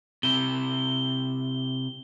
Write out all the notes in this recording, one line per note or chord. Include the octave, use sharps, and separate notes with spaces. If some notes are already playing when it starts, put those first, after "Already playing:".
C3 E4 G7